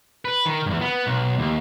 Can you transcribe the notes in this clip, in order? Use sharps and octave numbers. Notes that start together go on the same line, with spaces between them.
B4
D#3
E2 G2
B3
B1
D#2